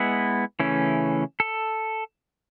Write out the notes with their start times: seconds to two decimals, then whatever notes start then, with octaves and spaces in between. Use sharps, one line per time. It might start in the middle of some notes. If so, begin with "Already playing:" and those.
Already playing: G#3 B3 E4 B4
0.60 C#3 E3 A3 C#4 E4
1.40 A4